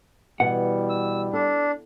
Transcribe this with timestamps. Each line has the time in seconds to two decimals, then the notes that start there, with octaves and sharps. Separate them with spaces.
0.40 B2 E3 G3 F#5
0.90 E6
1.33 D4 A4